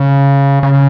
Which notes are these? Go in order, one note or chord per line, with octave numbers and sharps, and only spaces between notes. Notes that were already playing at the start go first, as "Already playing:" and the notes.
Already playing: C#3
C#3